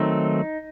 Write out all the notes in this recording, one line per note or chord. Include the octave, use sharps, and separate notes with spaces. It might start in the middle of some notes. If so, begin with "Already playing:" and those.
Already playing: D#3 F#3 A3 C4 D#4